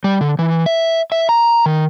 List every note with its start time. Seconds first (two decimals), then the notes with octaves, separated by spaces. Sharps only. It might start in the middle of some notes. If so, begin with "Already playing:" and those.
0.04 G3
0.21 D3
0.39 E3
0.66 E5
1.12 E5
1.29 A#5
1.66 D#3